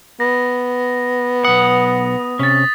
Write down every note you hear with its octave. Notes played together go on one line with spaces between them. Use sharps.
B3 A#6
B1 F#5 D#6
C3 C#4 A6 B6